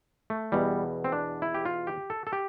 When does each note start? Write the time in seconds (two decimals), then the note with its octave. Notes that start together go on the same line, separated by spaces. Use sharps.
0.30 A3
0.52 E2 B2 G3
1.04 C4
1.12 D4
1.42 E4
1.54 G4
1.66 F4
1.87 G4
2.10 A4
2.27 A4
2.33 G4